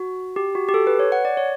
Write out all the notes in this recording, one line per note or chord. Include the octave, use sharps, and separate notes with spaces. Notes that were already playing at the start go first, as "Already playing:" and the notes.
Already playing: F#4
G4
F#4
G4
A4
B4
C#5
F#5
D5
C#5